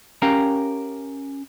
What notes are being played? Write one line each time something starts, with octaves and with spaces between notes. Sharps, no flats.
C#4 G4 A#4 F5 G5 A#5